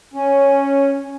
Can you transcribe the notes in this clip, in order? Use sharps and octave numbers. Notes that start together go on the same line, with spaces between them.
C#4